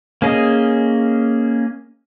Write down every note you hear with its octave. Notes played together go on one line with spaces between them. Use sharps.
A#3 C#4 G#4 D#5